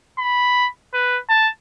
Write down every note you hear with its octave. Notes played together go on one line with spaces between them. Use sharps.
B5
B4
A5